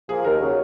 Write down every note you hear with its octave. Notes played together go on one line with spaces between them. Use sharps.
F3 A#3 G#4
D#2 A#4
C#3 F#3